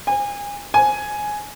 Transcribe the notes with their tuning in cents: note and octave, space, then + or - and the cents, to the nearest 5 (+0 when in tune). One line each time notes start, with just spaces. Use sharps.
G#5 -30
G#5 +5